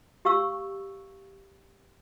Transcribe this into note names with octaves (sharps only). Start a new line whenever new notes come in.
G4 F5 C#6 E6